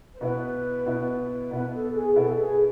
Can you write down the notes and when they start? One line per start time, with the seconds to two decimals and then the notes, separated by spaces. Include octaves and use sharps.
0.13 C5
0.21 B2 B3 E4 B4
0.86 B2 B3 E4
1.51 B2 B3 E4 B4
1.73 A4
1.94 G#4
2.16 B2 B3 E4 A4
2.38 G#4